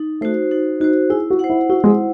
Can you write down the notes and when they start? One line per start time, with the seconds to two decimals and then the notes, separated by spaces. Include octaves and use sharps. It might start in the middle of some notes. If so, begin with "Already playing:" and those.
Already playing: D#4
0.21 A3 F#4 C5
0.51 D#4
0.80 D#4 F#4 C5
1.10 E4 G#4
1.30 F#4
1.39 C5 F#5
1.50 E4
1.69 E4 F#4
1.84 G#3